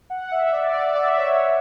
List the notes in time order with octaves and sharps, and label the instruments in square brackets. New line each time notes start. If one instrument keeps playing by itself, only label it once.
[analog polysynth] F#5
E5
D5
D5
D5
E5
D5
C#5